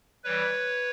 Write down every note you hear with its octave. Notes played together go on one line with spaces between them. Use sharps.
E3 G3 B4 C#5